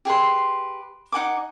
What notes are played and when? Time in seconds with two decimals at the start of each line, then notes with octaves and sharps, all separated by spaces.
0.05 G4 G#4 B4 C6
1.12 D#4 F#5 G#5 D6